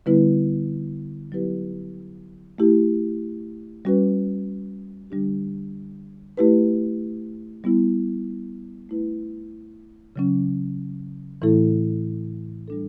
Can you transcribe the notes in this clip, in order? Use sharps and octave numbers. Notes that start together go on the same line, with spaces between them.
D3 G3 B3 E4 B4
F#3 B3 E4 G4 B4
A3 E4 G4
G3 C#4 F#4 B4
D3 G3 D4 G4
A3 E4 G4 B4
G3 B3 E4
A3 E4 B4
C#3 F#3 C#4
A2 E3 A3 E4 A4
G3 D4 A4